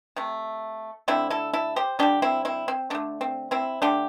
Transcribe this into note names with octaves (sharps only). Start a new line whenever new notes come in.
C3 A3
D3 A3 C4 E4
E4 A4
E4 A4
G4 C5
D3 G3 D4 G4
C4 E4
C4 E4
C4
D3 A3 D4
C4
C4 E4
D3 A3 D4 G4